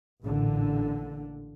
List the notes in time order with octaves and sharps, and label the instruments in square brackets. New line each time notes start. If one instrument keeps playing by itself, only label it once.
[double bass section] A1 A#2 D3